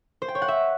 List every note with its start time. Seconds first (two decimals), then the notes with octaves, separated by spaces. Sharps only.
0.22 C5
0.28 G5
0.35 C#5
0.42 F#5
0.48 E5